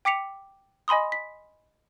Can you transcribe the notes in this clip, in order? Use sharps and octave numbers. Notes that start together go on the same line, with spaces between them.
G5 D6 B6 C#7 F7
D#5 G#5 B5 C6 D#6
B6